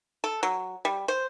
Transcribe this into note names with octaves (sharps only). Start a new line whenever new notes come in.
A4
F#3
G3
C5